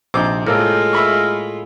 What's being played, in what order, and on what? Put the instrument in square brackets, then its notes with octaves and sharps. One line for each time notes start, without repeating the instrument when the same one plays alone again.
[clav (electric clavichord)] A#1 D#4 [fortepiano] C3 C4 D6
[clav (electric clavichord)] A2 A#3 A4 [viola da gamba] G#3 F4 [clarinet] A#4
[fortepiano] E5 B5 C#6